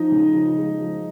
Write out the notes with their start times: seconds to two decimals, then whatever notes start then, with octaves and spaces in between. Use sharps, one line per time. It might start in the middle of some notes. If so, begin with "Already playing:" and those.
Already playing: F3 D#4 D#5
0.12 C#3
0.34 F3
0.58 G#3
0.81 F3